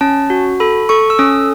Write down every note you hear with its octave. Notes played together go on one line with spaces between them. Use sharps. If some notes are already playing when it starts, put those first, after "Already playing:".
C#4 A5
F#4
A4 B5
A4 C#6
E6
C#4 D#6